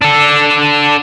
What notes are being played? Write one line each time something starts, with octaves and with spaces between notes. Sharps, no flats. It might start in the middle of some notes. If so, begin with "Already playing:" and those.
D4 A4